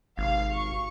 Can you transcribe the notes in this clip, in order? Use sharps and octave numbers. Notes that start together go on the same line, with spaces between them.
G#1 C3 F5
C#6